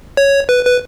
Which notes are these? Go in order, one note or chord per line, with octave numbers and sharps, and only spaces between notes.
C#5
B4
B4